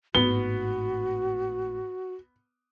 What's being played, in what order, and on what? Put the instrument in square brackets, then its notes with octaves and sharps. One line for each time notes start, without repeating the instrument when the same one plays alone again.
[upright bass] G#1 A2 [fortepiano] B3 [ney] F#4 [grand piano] G7